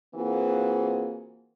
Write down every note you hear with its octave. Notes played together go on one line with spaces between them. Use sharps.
E3 A#3 C4 F4 F#4 G#4